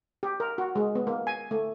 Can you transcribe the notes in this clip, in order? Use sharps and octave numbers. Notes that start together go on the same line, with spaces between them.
G4
A#4
F#4
G#3
B3
A#3
G#5
A3